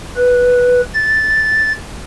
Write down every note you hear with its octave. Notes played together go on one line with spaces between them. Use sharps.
B4
A6